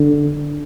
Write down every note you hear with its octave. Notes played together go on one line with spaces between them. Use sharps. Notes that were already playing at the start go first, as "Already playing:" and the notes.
Already playing: D3